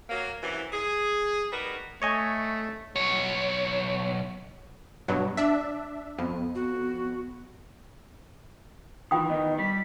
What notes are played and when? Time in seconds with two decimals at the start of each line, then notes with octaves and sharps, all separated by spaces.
0.10 F#3 A#3
0.43 F#2 C3 E3
0.73 G#4
1.52 G3 D#4 F#4 A#4 B4
2.02 A3 C#5 D#5 G#5
2.96 B1 C#5
5.08 G2 B2 F#3
5.37 D4 E5
6.19 F2 B3
6.55 F#4
9.11 D#3 E3 F4 G5 D#6
9.30 D#3 B3 D#5
9.58 G3 B6